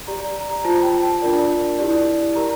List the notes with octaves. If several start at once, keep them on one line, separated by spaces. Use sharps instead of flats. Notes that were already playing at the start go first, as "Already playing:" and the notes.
G4 D5 A#5
A#5
F4 C5 A5
G5
A5
D4 F4 A#4 D5
E4 G4 D5
G4 A#4 D5 A#5